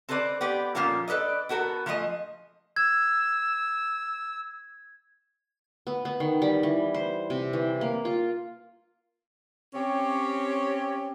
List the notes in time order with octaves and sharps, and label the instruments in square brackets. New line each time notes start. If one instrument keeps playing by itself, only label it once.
[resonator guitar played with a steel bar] C4 A4 B4 C5 D5
B3 G4 D5
A#2 F3 A#3 C#4 F4 A4
A4 B4 D5 D#5
B3 F#4 A4 A#4
F3 A3 G#4 C#5 D#5
[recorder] E6 [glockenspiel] G#6
[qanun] B3
B3
D#3
G3
E3
C5
C3
E3
A#3
F4
[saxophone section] C4 C#4 G4 C#5